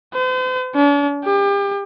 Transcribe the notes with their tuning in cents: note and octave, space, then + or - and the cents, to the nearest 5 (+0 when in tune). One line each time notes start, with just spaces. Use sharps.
C5 -45
D4 -45
G4 +35